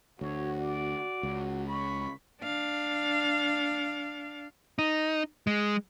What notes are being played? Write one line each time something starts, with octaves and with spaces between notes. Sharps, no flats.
D2 F#4 C#5
D5
C#2
B5 C#6
D4 F5
D#4
G#3